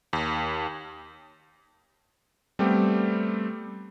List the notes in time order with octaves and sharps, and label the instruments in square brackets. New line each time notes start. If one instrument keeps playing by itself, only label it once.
[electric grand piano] D#2
G3 A3 B3 C4 G4